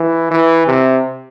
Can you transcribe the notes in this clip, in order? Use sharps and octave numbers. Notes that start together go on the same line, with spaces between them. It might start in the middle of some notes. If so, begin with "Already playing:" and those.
Already playing: E3
E3
C3